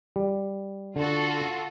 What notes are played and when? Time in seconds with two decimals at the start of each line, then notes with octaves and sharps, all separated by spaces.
0.16 G3
0.96 D3 F4 F#4 A4